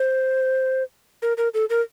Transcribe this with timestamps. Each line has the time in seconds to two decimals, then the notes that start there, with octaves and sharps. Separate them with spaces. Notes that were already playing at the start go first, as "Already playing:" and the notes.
Already playing: C5
1.22 A#4
1.37 A#4
1.54 A4
1.70 A#4